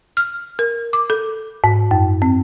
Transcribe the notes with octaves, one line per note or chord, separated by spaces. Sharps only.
F6
A#4
D6
A4
G#2
F#2
C4